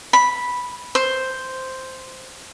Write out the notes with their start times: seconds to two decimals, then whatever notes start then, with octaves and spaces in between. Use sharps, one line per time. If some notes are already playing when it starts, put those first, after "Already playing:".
0.13 B5
0.95 C5